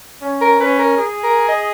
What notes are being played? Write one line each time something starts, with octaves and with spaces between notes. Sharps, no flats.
C#4
A#4
C#4 B4
A#4
G#4
A#4
D#5